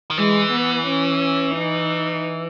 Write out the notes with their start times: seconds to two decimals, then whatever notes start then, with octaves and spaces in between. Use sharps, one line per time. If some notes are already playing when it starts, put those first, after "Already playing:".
0.11 D#3
0.18 E3 G#3
0.51 B3
0.87 C#4
1.55 D#4